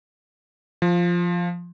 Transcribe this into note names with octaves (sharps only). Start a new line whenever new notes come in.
F3